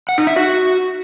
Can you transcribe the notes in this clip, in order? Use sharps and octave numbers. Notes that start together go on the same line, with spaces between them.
F#5
D#4
E5
F#4